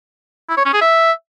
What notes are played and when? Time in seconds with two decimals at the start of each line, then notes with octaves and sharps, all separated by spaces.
0.49 E4
0.57 C#5
0.65 C#4
0.73 G#4
0.81 E5